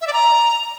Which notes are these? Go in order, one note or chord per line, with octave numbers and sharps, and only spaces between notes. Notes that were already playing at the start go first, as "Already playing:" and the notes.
E5
D5
A#5